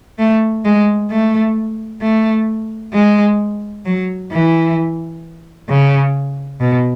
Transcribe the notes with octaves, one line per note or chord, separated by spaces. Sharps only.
A3
G#3
A3
A3
G#3
F#3
E3
C#3
B2